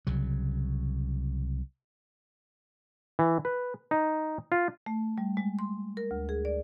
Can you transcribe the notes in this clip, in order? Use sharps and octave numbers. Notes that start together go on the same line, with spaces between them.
C2 C#3 F#3
E3
B4
D#4
F4
A3
G3
G#3
C6
A#4
D2
G#4
D5